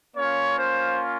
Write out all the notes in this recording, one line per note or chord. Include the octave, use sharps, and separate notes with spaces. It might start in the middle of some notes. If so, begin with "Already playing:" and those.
A#3 C#4 F4 C#5
C5